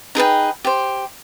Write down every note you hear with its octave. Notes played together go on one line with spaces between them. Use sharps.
D#4 G#4 B4 G5
G4 C5